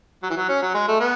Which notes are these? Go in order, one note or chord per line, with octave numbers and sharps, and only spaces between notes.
F#3
E3
F#3
C#4
F#3
G#3
A3
B3